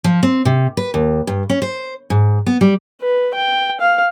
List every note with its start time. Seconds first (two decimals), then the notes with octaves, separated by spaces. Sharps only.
0.04 F3
0.23 C4
0.45 C3
0.77 B4
0.94 D#2
1.27 G2
1.50 C#4
1.62 C5
2.10 G#2
2.46 B3
2.61 G3
3.01 B4
3.35 G5
3.80 F5